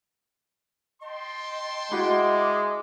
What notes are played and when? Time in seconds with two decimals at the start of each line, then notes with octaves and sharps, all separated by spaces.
1.01 D#5 G5 A5 C6
1.92 G#3 E4 F#4 D#5 D6